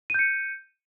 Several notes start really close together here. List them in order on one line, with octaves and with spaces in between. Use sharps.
D#7 G6 C#7